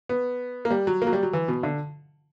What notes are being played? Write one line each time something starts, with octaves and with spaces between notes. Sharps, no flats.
B3
A#3
G3
F#3
A#3
F#3
G3
F#3
E3
B2
D3